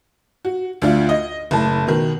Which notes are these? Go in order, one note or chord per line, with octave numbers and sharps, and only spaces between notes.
F#4
D2 D4 F4
D#5
F#1 A2 A5
B2 D#3